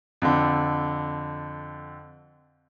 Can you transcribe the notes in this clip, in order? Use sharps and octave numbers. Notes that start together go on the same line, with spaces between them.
F2 D3